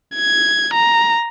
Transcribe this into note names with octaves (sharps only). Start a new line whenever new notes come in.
G#6
A#5